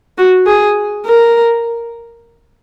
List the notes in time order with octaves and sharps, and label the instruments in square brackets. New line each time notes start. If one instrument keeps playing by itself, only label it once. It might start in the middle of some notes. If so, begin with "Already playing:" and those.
[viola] F#4
G#4
A#4